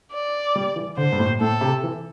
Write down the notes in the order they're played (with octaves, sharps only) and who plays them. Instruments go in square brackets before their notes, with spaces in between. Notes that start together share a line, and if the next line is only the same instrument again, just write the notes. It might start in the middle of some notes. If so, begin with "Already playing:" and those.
[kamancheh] D5
[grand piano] G3
E3
[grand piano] D3 [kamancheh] C5
[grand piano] G2
A2
[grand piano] A2 [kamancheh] A4
[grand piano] C3
E3